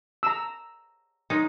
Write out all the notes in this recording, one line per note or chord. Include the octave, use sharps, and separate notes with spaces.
A#5 E6
G#3 C#4 D#4